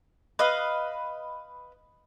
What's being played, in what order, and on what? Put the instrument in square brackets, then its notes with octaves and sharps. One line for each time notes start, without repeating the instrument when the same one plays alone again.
[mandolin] B4 D#5 F5